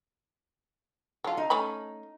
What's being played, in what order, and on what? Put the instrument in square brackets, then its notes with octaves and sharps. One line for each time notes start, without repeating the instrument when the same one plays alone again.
[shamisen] F#3 F4 [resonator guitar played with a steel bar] A4
[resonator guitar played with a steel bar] D#4
[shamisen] A3 C#4 B5